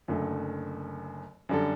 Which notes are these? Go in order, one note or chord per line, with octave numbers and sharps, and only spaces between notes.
F#1 F#2 D3 A3
F#2 D3 G3 D4 A4